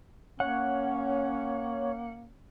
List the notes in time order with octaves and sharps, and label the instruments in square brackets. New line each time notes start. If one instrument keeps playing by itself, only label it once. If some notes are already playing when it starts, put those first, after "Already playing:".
[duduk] A#3 [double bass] C#4 [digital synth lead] C#5 [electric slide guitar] F#5